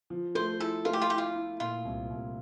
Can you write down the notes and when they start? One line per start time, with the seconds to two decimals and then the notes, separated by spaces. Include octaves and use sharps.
0.10 F3
0.35 A3 C5
0.60 E4 A4
0.85 A3 F4
0.93 G4
1.02 F4
1.10 E4 G4
1.18 F4
1.35 E4
1.60 A#2 F4
1.85 C2
2.10 C2